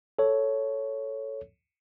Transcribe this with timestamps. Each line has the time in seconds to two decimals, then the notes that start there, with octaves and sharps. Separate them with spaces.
0.19 A4 C#5